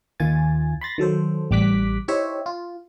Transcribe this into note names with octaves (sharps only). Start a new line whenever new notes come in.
D#2 D#3 F4 G#5 A6
B5 C6 A6 A#6
D#3 F#3 A4 C5
A1 G3 D6 F#6 B6
D#4 E4 G4 C5 C#5 E5
F4